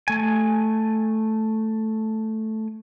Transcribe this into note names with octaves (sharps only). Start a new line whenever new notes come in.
A3 G#5